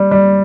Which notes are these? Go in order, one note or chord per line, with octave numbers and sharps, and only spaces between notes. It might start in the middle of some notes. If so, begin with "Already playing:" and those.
Already playing: G3
G3